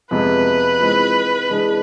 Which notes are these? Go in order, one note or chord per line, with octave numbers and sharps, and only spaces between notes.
F2 C3 G#3 B3 B4
E3 G#3 C4 F4
C3 E3 G#3 D4 G#4